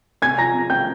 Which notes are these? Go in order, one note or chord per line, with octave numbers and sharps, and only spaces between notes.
C3 G#5 G#6
F3 A#5 A#6
C3
C4 G5 G6